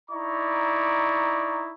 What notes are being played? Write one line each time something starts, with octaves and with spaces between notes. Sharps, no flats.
D#4 E4 D5 A#5 C#6